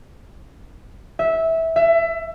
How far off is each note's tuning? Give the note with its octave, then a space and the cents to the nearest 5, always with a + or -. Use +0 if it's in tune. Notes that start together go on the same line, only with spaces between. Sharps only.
E5 -15
E5 +20